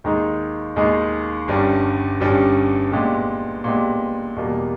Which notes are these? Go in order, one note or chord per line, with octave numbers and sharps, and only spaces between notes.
D#2 D#3 G#3 D#4 G#4
D#2 D#3 G#3 D#4 G#4
G1 G2 G3 C#4 G4
G1 G2 G3 C#4 G4
A#2 G#3 B3 G4
A#2 G#3 B3 G4
E2 B2 G3 A#3